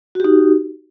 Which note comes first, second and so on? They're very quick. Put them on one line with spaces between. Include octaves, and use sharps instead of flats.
F#4 G4 D#4